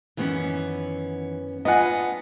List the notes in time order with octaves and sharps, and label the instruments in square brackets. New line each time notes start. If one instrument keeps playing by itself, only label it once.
[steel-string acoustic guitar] F#2 B3 C#4 [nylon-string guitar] D#3 E3
[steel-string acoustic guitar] B3 [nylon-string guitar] D4 F4 G#5 [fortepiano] D#5 F#5